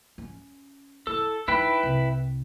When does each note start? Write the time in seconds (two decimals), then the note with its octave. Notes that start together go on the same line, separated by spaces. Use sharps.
0.18 C#4
1.07 E4 A4
1.48 D#4 E4 B4 G5
1.83 C2